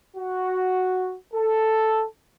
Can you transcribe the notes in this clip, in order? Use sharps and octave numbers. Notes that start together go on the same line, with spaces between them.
F#4
A4